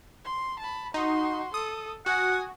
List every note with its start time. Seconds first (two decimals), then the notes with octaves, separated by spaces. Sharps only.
0.25 C6
0.59 A5 B5
0.94 D#4 F#4 C6
1.54 A4 D#6
2.06 F#4 F#5 G#5 D#6